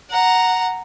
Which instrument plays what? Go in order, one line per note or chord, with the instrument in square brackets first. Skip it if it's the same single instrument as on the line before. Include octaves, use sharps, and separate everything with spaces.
[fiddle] F#5 A#5